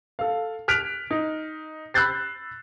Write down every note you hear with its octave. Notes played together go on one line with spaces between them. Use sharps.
A4 F5
F6 F#6 B6 D7 F7
D#4
B5 E6 F#6 G6 A6 C7